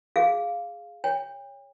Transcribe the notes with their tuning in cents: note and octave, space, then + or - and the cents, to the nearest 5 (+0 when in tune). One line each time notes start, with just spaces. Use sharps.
G#4 +0 F5 +0
C#5 +5 G5 +40